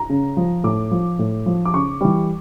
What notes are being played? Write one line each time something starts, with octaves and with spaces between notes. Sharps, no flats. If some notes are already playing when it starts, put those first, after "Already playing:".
Already playing: A#5
C#3
F3
A2 D6
F3
A2
F3
D6
C#3 C#6
E3 G3